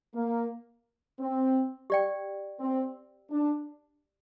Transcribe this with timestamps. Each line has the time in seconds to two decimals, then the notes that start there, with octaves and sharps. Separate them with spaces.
0.15 A#3
1.20 C4
1.90 G4 D5 G5
2.60 C4
3.30 D4